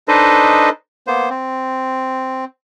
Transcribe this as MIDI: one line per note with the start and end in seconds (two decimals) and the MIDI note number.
0.08 0.69 62
0.08 0.69 63
0.08 0.69 69
0.08 0.69 71
0.08 0.69 72
0.08 0.69 75
1.07 1.29 58
1.07 1.29 59
1.07 1.29 72
1.30 2.45 60